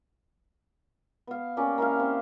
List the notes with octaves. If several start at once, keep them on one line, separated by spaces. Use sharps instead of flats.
B3 F5
A#3 C#4 G4 D5
A#3 E4 G4 F5
C4